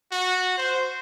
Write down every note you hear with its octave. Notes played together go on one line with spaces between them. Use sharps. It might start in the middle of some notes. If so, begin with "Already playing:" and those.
F#4
C5